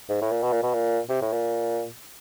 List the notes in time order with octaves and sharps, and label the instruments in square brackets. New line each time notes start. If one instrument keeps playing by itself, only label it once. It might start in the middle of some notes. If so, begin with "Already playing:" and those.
[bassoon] G#2
A2
A#2
B2
A#2
B2
A#2
C3
A2
A#2